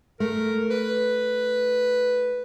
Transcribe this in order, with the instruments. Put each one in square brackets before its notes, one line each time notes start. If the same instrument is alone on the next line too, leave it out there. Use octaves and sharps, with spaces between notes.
[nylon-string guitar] A3 [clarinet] A#4
[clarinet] B4